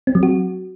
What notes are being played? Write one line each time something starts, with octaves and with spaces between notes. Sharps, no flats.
C4
F#3
F#4